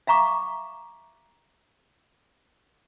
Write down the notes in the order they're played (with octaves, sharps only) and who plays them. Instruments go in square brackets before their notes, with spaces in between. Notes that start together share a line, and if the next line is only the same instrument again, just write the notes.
[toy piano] E5 F5 A#5 C#6 D6